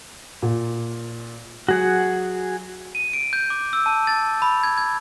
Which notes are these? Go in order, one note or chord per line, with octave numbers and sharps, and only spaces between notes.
A#2
F#3 F#4 G#4 F#5
D#7
D7
G6
D6
E6
A5
A6
B5
G#6
G#6